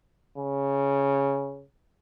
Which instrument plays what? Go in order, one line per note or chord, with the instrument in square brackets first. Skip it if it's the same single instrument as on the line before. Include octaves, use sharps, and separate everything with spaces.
[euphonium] C#3